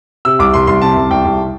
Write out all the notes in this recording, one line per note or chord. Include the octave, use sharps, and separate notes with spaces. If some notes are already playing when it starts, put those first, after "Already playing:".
C3 E6
C2 D6
C2 C6
C2 C6
C3 A5
C2
C2 G5
C2